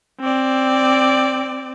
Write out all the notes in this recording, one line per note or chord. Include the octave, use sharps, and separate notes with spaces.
C4 D5